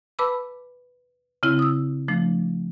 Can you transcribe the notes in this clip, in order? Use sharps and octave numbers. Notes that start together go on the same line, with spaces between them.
B4 A5 B5 D6 E6
C#3 C4 E4
D#6 E6
F3 A3 D4